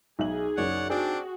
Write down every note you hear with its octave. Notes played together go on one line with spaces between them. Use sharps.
B1 D#4 G#4 E5 F#7
F#1 F#2 C#5 D5 F#5
C4 D4 F#4 G#4 G5